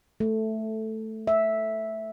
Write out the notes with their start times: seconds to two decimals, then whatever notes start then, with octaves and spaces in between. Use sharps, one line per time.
0.20 A3
1.27 E5